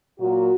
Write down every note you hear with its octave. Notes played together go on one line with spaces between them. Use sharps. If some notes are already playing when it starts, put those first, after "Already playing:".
A#2 F#3 A#3 F#4